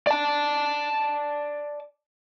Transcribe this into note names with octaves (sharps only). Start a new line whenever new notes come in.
D5 A5